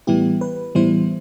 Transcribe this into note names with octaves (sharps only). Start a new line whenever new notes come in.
A2 E3 G3 B3 E4 G4
B4
A2 E3 G3 B3 E4 C5